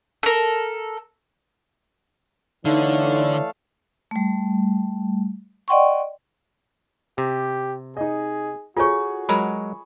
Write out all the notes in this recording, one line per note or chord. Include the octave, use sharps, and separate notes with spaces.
A4 A#4
D3 E3 A3 D#4 A4 C#5 D5 F5
G3 A3
D5 D#5 F#5 G5 C6 C#6
C3 G4
D#4 G#4 D#5
F4 F#4 G#4 A4 C#5 C#6
F#3 G#3 A#4 B5